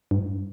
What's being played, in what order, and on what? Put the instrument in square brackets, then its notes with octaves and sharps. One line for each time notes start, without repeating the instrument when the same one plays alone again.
[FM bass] G2